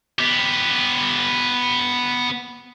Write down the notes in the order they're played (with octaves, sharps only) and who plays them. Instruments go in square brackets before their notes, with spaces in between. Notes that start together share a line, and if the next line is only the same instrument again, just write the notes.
[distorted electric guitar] B3 G4